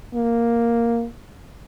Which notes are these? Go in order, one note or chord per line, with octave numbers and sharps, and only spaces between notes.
A#3